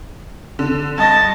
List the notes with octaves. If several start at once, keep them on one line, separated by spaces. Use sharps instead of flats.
D3
G2 D#5 A5 A#6